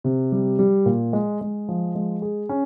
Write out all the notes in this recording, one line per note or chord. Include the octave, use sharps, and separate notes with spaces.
C3
G3
G3
A#2
G#3
G#3
F3
G#3
G#4
C#4